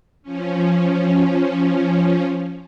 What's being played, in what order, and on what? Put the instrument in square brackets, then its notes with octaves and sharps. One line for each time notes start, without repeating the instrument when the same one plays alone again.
[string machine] F3 C#4